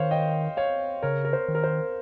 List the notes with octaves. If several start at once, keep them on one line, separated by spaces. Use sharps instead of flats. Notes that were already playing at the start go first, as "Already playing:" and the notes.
Already playing: D#3 C5 C#5 F5
D#5 G5
C#5 F5
C#3 A#4 C#5
A#4
C5
D#3
A#4
C5